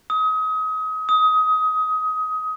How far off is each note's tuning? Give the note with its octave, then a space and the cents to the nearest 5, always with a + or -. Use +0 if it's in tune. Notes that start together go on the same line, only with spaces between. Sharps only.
D#6 +30
D#6 +20